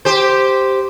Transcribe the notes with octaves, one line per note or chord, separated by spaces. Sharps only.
G4 C5